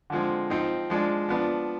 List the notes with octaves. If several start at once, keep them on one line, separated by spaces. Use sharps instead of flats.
D3 F3 G#3 C4
F3 C4 D#4
F3 G#3 D4
F3 B3 D4